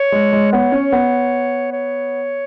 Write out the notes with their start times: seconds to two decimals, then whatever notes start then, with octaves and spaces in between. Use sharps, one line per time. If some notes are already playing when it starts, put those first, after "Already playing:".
Already playing: C#5
0.12 G#3
0.33 G#3
0.53 B3 C#5
0.72 C#4
0.92 B3
1.72 C#5